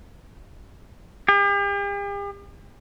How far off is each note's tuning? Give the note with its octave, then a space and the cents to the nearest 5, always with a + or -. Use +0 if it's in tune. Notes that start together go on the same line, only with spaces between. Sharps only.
G4 +45